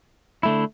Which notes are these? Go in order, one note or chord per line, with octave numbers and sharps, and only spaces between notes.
D3 A3 E4